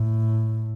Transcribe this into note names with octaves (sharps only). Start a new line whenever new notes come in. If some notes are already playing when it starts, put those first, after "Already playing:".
Already playing: A2